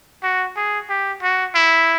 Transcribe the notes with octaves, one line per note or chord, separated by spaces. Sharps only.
F#4
G#4
G4
F#4
E4